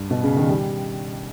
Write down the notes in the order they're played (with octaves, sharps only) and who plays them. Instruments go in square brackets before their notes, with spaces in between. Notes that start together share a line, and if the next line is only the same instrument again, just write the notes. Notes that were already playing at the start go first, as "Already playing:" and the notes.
Already playing: [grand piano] G2
B2
C#3
D#3
G3